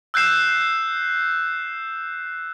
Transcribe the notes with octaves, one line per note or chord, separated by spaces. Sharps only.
E6 F#6 G6 C7 E7